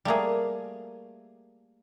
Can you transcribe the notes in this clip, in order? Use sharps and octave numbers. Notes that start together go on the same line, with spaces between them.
G3 A3 A#3 G#4